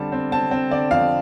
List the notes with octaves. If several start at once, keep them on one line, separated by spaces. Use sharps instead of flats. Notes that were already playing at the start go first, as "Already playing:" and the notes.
Already playing: D3 G3 C4 A5
C4
C4 A5
C4
D3 D5
F2 F5